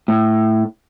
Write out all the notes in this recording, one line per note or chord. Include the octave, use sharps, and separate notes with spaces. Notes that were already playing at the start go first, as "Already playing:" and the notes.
A2